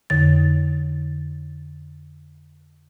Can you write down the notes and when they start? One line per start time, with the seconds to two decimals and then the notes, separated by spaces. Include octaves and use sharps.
0.10 F2 D3 A6